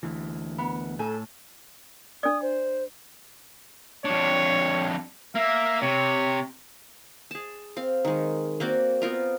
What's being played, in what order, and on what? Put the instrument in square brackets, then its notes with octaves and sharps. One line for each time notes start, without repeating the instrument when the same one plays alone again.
[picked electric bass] D2 E3
[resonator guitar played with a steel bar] B3
[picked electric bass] A2 [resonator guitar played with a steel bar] A4 G#5
[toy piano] D4 D5 [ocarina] D#6
[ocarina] C5
[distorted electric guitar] F2 D4 [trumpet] C#5
[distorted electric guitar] A#3 [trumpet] E5
[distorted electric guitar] C3 [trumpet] C#5
[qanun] G#4 A5
C4 F5
D#3 G#3
A#3 C4 F#4 D5
B3 C4 F4 A#4